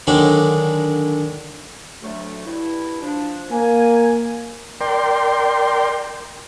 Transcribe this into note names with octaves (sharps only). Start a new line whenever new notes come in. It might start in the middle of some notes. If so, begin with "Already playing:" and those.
D3 D#3 F#3 G#3 D4
D2 F#3 A3
G2 E4
F3 D4
A#3 G#5
A#4 D5 G5 C6